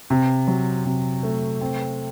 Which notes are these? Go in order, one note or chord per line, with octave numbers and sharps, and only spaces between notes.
C3
F#3
C3
A3
C4